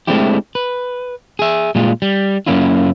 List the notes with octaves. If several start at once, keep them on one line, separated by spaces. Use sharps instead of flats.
G#3 A3 C4 D4 E4 G4
B4
G#4 E5
A#2 G3 G#3 F4
G3
F#2 B2 A#3 C#4 E4 F4